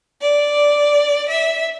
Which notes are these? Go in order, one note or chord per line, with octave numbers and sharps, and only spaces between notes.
D5
E5